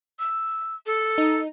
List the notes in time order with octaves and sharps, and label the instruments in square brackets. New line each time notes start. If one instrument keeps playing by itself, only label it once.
[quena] E6
A4
[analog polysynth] D#4